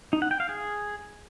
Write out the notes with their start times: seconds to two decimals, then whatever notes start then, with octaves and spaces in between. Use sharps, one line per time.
0.13 D#4
0.22 F#5
0.31 G5
0.40 F5
0.49 G#4